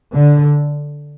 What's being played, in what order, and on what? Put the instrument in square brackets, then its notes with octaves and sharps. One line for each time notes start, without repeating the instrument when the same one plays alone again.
[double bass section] D3